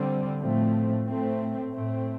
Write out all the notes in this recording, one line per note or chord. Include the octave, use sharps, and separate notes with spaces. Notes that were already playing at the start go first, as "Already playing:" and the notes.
Already playing: D3 G3 C4
A2 F3 A3 C4
A2 A3 C4
A2 A3 C4